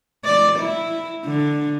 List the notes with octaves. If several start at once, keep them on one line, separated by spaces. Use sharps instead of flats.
D5
E4
D3